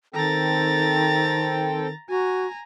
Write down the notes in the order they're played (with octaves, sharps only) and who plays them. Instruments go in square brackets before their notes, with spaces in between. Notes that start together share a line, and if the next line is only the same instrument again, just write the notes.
[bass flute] D#3 [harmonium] C4 A4 G5 [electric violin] A#5 A6
[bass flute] F#4 [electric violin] G#5 A#5